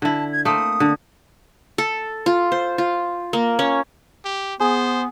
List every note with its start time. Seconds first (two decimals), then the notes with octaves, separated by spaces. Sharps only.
0.02 D3 E4 A5
0.32 G#6
0.45 A3 A#3 C4 D#6
0.80 D3
1.78 A4
2.26 F4
2.52 C5
2.78 F4
3.33 A#3
3.59 C#4
4.25 G4
4.60 B3 G#4 C5